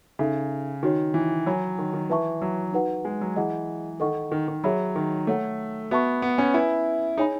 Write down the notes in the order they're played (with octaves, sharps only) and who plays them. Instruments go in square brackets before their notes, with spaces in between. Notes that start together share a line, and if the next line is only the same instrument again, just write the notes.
[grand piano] C#3 [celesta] D#4 A4 E5
[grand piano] D#3 [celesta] D#4 F#4 C#5
[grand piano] E3
[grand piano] F#3 [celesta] C#5 G#5 B5
[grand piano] D#3
D#3
[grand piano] E3 [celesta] B4 E5 A5 C#6
[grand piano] F#3
[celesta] D#4 F#4 B4 F#5
[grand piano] G#3
F#3
[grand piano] E3 [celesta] G#4 D#5 F#5
[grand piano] D#3 [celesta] A4 D#5 F#5 C#6
[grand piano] D#3
D#3
[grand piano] F#3 [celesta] G#4 C#5 E5 B5
[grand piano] D#3
[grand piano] A3 [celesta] A4 C#5 F#5
[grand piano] B3 [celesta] F#4 B4 E5 A5 C#6
[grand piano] B3
C#4
[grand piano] E4 [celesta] B4 E5 G#5 B5
[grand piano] D#4 [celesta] G#4 C#5 G#5 B5